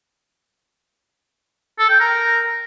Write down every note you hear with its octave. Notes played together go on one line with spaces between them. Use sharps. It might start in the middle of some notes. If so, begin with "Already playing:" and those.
A4
G5
A#4